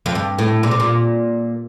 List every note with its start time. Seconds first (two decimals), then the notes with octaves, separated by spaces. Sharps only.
0.06 F2
0.15 G2
0.39 A2
0.63 A#2
0.71 C3
0.80 A#2